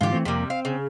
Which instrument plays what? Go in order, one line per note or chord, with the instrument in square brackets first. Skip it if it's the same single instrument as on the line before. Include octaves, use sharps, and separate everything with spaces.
[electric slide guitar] G#2 D3 E3 [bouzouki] F4 G4
[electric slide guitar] E3 A3 C4
[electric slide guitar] F2 A#3 [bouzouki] C3 G3
[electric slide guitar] C4 [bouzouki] F5
[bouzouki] C#3